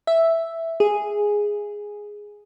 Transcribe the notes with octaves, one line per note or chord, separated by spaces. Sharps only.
E5
G#4